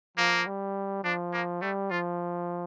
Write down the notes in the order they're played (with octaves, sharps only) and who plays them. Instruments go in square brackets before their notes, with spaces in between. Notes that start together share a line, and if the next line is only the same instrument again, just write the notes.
[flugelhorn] F3 [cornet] A#3
[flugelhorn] G3
[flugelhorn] F3 [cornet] D4
[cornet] A#3
[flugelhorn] G3 [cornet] A3
[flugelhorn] F3 [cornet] F4